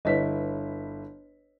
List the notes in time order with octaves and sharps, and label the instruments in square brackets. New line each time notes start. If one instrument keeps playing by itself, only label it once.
[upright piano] G1 E4 B6 [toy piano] B4 C#5 D#5